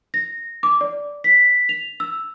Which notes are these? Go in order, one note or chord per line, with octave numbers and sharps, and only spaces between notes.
A#6
D6
D5
B6
F7
E6